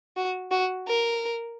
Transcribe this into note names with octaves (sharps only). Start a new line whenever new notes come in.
F#4
F#4
A#4